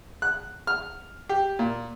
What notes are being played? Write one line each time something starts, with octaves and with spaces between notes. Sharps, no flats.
F#6
F6
G4
A#2